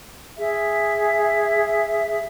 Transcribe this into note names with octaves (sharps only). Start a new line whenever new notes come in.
G#4 E5